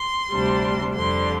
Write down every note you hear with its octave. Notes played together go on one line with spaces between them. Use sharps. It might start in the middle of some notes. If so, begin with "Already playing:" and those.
Already playing: C6
D2 C3 G3 D4
F2 D3 G3 C6